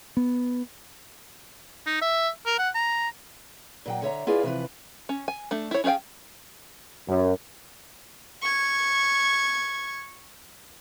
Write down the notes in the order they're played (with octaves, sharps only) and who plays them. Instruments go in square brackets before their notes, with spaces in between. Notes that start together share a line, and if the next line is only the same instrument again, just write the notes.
[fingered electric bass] B3
[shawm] D#4
E5
A#4
F#5
A#5
[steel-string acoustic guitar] A#2 F#3 G5
D3 C#5 E5 A#5
E4 F4 G#4 B4 D5 F5
C3 E3 F3 B4
[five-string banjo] C#4
G#5
A3 D4
E4 C#5
C#4 G#4 A4 F5 G5
[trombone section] F#2
[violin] C#6 G#6